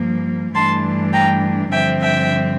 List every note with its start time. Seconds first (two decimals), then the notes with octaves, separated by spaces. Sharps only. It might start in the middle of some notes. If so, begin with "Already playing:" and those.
Already playing: G2 F3 A#3
0.55 G2 E3 A3 D4 A5 C6
1.13 G5 A#5
1.72 G2 D3 F3 C4 E5 G5
2.01 E5 G5